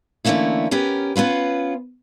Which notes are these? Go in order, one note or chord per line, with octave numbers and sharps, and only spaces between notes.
D3 E3 A3 A#3 C#4 E4
B3 C#4 G4 A#4
B3 C#4 F4 B4